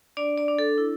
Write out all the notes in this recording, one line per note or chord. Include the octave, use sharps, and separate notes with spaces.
D4 D5
D5
D4
A4
E4